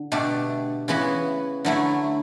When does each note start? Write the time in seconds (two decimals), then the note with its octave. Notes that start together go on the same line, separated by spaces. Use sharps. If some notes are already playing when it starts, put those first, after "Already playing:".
Already playing: D3
0.12 B2 A3 D4 G4
0.88 C#3 E3 B3 F#4
1.65 D3 F#3 A3 E4